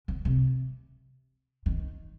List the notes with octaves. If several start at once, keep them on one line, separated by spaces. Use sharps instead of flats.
D3
C3
D#3